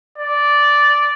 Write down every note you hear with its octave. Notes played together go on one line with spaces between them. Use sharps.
D5